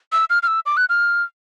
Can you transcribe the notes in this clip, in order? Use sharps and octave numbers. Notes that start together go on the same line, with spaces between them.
E6
F6
F6
E6
D6
F#6
F6